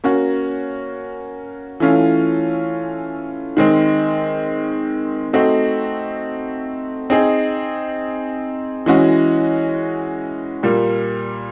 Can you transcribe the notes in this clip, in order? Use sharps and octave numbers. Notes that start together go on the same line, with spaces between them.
A#3 C#4 F#4
E3 A3 C#4 F4
D#3 G#3 C4
A3 C4 D#4 F#4
C4 D#4 G#4
E3 G#3 C#4 F#4
A#2 G3 A#3